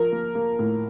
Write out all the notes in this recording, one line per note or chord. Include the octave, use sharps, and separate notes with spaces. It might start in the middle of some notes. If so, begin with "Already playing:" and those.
Already playing: F3 A#4
A#3
A#3
A2